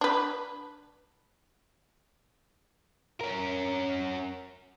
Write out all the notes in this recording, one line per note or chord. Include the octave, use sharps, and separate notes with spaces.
D4 B4
C#4 A#4